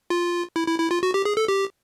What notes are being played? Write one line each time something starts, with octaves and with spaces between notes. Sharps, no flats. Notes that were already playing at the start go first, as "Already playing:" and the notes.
F4
E4
E4
E4
F4
F#4
G4
G#4
A4
G4